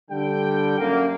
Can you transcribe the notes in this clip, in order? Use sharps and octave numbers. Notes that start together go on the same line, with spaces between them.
D3 G3 G5
F#2 A#3